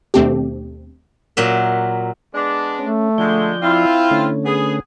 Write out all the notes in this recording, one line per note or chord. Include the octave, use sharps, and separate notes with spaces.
D#2 B2 A3 C4 D4 G4
A#2 F#3 E5
G#3 B3 D4
A3 C#4
D3 F3 G#3 D5 G6
C4 E4 F4
D3 A3 C#4
B3 G#4